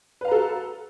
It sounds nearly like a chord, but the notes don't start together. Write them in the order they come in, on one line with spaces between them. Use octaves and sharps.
B4 F5 A#5 A4 F#4